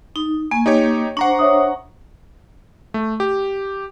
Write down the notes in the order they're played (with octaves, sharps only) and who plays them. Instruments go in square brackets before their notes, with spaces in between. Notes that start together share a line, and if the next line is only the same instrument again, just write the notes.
[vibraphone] D#4
[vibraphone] A#3 [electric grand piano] G#5
[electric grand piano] D#4 G4 C#5
[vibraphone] D4 C5 [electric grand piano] F#5 A#5 C#6
[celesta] C#5 E5 D#6
[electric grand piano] A3
G4